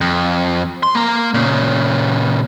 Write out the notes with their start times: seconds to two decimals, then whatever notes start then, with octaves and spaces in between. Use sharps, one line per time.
0.01 F2
0.83 C6
0.95 A#3 A#5
1.34 A#2 C#3